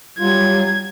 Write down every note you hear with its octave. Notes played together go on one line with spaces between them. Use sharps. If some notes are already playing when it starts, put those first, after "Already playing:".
F#3 G3 F4 G#6